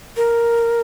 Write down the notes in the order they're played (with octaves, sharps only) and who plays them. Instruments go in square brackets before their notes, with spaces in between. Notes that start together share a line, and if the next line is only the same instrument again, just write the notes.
[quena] A#4